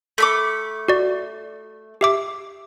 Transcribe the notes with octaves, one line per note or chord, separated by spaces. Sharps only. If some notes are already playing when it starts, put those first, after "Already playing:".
A3 B5 D6
F#4 D5
G4 E5 D6